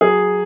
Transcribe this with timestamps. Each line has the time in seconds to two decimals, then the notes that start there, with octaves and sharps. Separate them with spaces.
0.01 F#3 G#4